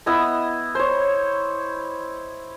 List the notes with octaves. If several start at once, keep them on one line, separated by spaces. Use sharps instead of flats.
B3 E4 D#5
C5 C#5